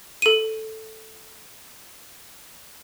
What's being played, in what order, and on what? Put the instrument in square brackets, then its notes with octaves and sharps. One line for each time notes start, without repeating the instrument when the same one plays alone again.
[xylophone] A4 D#7